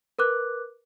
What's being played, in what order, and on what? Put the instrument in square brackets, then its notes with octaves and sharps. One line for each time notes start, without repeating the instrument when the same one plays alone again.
[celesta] A#4 B4 D6 F#6